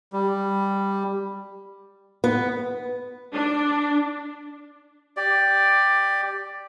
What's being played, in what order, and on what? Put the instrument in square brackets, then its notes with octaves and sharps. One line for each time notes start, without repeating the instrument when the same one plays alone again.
[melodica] G3
[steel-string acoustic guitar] B3
[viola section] D4
[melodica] G4 D5